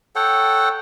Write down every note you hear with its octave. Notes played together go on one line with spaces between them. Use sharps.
A4 C#5 F#5 G5